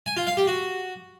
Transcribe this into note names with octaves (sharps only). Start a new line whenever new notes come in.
G#5
F4
F5
G4
F#4